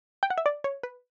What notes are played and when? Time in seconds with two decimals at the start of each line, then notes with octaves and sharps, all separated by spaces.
0.23 G5
0.30 F#5
0.38 E5
0.46 D5
0.64 C#5
0.83 B4